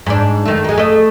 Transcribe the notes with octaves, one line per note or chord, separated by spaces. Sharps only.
G#2 D4
D#3 A3
G#3 A#3
A3 D#5